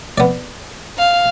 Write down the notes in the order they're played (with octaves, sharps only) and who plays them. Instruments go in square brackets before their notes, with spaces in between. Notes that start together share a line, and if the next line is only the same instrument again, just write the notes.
[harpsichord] B3 D5
[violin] F5